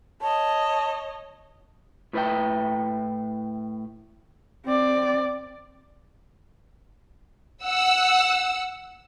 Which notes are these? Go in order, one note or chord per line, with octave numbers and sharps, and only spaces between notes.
C#5 D#5 A5
A2 E4 B4 C#5 E5 G5
C4 D5
F#5 E6